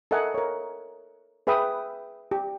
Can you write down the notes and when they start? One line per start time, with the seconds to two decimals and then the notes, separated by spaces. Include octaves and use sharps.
0.11 A4 A#4 D#5 E5 F#5 G#5
0.34 A#4 C#5
1.47 G#4 B4 E5 G5 B5 D#6
2.31 G4